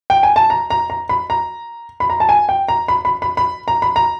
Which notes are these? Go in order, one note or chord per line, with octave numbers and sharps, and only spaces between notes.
G5
G#5
A5
A#5
A#5
A#5
B5
A#5
B5
A#5
A5
G#5
G5
A#5
B5
B5
B5
B5
A#5
B5
A#5